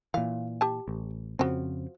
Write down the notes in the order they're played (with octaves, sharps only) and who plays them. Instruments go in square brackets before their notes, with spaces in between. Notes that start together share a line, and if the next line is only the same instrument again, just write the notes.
[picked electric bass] A#2 E3 [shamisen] F5
[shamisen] G4 A5
[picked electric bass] A1
[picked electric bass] F2 C#3 C4 [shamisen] F3 F#4